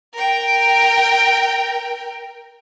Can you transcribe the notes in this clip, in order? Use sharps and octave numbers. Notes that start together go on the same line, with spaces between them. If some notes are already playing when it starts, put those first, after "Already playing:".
A#4 G5